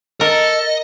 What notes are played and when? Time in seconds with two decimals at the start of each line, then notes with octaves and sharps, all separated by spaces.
0.21 A4 A#4 D#5